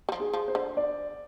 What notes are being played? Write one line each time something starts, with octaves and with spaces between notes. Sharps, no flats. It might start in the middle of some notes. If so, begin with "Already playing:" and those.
G3
F3
G#4
F3
C5
D3
D5